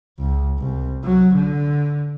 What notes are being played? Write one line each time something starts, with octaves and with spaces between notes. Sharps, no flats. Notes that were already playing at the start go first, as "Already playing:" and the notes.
C#2
C2
F#3
D3